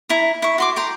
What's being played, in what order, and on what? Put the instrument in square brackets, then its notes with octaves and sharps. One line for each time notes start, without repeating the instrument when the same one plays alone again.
[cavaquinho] E4 A#5
E4 C#6
F#4 C6 D6
G5 A#5 C6